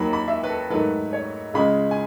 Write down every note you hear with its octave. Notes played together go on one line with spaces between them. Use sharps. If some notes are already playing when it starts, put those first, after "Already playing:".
Already playing: D#2 D#3 F#3 B5
B5
E5
B4
A4
G#2 D#3 F#3 A3 B4
C#5
C#2 C#3 G#3 B5
G#5